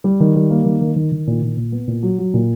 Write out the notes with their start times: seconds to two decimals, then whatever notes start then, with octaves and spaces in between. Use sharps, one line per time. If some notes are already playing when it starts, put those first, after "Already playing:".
0.04 G3
0.20 D#3
0.36 G3
0.51 A#3
0.66 D#3
0.81 D#3
0.96 D#3
1.12 D#3
1.27 A#2
1.42 A#2
1.57 A#2
1.72 B3
1.87 A#2
2.03 F#3
2.19 F#3
2.34 A#2